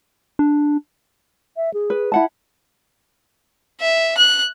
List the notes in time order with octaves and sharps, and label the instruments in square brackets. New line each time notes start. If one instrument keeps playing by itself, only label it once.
[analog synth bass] D4
[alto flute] E5
G#4
[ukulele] B4
E4 F#5 A5
[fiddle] E5
F#6